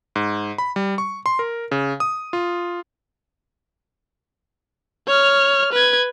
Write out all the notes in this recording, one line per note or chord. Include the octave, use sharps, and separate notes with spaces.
G#2
B5
G3
C#6
C6
A#4
C#3
D#6
F4
C#5 F6
B4 G#6